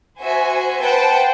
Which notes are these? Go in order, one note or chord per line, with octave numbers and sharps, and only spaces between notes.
F#4 C5 E5 G#5
B4 C5 F#5 G5 A5